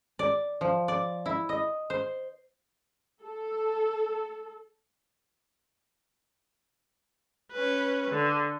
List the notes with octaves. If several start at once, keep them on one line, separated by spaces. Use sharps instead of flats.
D5
F3
D5
E4
D#5
C5
A4
C#4 B4
D3